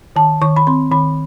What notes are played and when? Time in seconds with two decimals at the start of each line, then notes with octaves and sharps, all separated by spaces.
0.16 D#3 A5
0.41 D#3 C#6
0.56 B5
0.67 C4 C6
0.92 D#3 B5